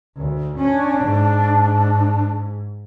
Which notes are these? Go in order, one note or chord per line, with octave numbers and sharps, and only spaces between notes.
D2
C#4 D4
G#2